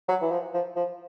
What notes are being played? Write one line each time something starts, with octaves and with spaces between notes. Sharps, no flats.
F#3
E3
F3
F3
F3